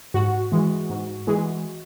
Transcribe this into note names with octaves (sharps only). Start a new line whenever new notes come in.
G#2 F#4
E3 G#3
G#2
E3 G#3